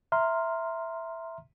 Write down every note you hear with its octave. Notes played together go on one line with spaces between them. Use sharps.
E5 A#5 C6 F6